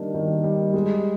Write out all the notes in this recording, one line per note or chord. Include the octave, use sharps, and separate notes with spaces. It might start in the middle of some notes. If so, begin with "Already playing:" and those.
Already playing: D#3 G3 A#3 D4
D#3
G3
G#3